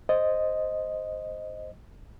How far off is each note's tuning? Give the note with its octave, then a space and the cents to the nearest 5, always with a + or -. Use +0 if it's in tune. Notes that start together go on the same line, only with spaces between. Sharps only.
C5 +0 D#5 +0